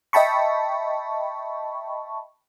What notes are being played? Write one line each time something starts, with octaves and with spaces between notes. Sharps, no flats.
D#5 E5 G5 A5 B5 C#6